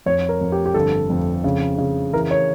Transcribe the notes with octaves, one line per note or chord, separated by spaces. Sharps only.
F2 C#5
A#4
F2
G4
G4
G1 A4
F2
C#3
C#3
E3 A#4
C#5